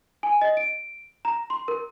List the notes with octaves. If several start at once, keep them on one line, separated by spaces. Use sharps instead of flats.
G#5
D#5
D7
A#5
C6
A#4